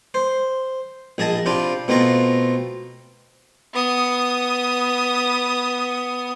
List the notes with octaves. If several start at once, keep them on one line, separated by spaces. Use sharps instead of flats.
C5
A#1 G#4 D#5 A5
C3 D4 F4 B5
B2 A3 C4 F4 A#5
B3 D#6